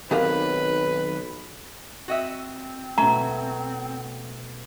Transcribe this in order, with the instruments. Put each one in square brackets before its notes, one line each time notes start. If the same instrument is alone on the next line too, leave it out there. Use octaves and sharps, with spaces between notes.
[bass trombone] B1 [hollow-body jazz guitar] D#3 F#3 C4 [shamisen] G4 A#4 F5 [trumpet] B4
[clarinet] C4 [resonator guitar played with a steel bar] F#4 D#5 E5
[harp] B2 A3 [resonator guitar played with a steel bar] C#4 [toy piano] A#5